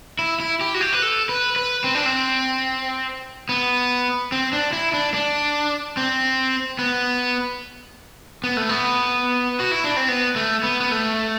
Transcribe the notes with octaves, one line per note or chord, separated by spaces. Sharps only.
E4
E4
G4
F#4
G4
B4
A4
B4
B4
C4
D4
C4
B3
C4
D4
E4
D4
D4
C4
B3
B3
A3
B3
F#4
E4
D4
C4
B3
A3
B3
B3
A3